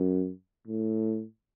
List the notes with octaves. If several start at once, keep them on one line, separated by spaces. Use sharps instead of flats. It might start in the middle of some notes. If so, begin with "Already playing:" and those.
Already playing: F#2
A2